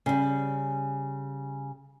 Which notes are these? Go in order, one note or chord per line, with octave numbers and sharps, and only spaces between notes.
C#3 G3